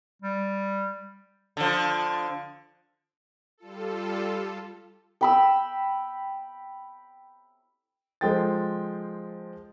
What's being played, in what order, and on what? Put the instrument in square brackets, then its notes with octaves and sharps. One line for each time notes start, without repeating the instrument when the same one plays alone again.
[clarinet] G3
[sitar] D3 F3
[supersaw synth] G3 F4 A4
[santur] G5 B5 E6
[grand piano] F3 G#3 A4 G5 C6 A6